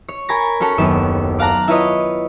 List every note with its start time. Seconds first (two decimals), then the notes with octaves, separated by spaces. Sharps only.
0.09 C#5
0.29 A#4 G#5 B5 C#6 A6 A#6
0.60 C#4 F#4 A4 C#5 A5
0.78 F#1 D#2 B3 E7
1.39 D5 F5 F#5 A5 A#5
1.68 E4 F4 B4 C#5 D#5